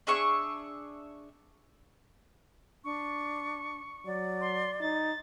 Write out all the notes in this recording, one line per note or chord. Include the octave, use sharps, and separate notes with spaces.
D4 G#4 E5 C#6
D4 C#6
F#3 D5
C6
D#4 A6